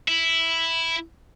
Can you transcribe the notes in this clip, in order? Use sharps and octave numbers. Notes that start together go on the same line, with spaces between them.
E4